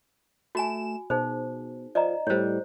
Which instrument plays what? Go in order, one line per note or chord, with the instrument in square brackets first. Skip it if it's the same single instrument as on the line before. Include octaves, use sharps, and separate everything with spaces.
[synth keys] A3 E7 [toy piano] F#4 G#5
[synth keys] B2 [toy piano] D#4 G#4 C5
[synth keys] F3 [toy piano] D5 D#5 A#5
[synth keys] A2 G3 [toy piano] C5 C#5